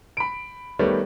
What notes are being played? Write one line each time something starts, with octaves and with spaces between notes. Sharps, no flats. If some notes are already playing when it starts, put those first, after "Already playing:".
B5 D7
D#3 G3 A3 B3 C#5